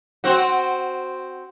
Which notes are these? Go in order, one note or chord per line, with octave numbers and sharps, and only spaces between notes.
C4 F#4